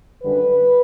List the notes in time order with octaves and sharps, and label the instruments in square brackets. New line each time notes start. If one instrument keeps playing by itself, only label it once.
[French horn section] F#2 D3 G3 B4